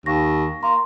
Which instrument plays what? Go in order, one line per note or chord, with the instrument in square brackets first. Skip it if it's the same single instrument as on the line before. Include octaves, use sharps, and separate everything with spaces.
[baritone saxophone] D#2 [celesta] F5 C#6 A#6
[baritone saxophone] A#3 [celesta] A#5 C6